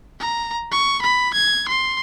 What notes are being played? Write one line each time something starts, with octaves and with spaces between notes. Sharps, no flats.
A#5
C#6
B5
G#6
C6